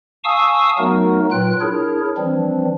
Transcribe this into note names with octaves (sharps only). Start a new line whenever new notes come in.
F5 G#5 A5 C#6 D#6 E6
F#3 A3 B3 D#4 F#4 A#4
A#2 F#3 F4 B4 G5 F#6
D4 E4 G#4 A#4 C#5
E3 F3 G3 C4 D4